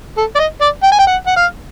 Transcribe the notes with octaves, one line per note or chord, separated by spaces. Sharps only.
A4
D5
D#5
D5
G5
G#5
G5
F#5
F#5
F5